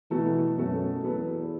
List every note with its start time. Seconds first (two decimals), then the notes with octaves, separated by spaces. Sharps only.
0.11 B2 E3 A3 F#4 A4
0.56 F#2 B2 A3 F#4 A4
1.03 E2 F#3 B3 A4